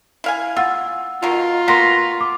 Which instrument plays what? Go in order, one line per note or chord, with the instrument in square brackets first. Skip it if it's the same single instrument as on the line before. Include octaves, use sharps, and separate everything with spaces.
[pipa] E4 F5 G#5
[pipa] F4 [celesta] F#5 E6
[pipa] B2 D#3 [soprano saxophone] F4
[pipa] A#3 B3 F#4 [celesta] C6 A#6 B6
[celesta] D6